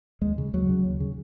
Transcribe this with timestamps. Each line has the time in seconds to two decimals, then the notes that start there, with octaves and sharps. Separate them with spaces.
0.21 D#2 G#3
0.38 C#3
0.53 D#2 F#3
0.69 C#3
0.84 D#2
1.00 C#3